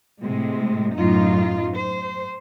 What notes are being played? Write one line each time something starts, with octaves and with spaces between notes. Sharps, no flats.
A2 C3 G#3
F#2 A2 D#4 F4
C5